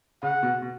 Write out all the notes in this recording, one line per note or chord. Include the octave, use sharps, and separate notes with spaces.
C#3 F#5
B2
B2